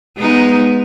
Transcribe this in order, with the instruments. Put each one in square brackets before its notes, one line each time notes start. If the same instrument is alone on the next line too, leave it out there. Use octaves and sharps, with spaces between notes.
[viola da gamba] G#3 B3 D#4